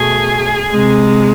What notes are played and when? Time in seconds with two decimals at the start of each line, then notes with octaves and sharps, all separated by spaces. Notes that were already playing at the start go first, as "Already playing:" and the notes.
Already playing: B2 A3 G#4
0.71 C3 G#3